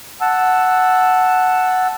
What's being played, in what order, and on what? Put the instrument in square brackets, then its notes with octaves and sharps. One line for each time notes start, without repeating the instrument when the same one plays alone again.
[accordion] F#5 A5 E6